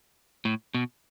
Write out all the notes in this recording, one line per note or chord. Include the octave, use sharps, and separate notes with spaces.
A2
B2